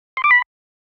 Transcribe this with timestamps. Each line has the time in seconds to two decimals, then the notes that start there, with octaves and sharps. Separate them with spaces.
0.17 C6
0.24 D6
0.31 B5